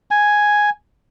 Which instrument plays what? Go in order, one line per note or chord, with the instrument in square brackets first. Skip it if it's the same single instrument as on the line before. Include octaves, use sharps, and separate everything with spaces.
[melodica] G#5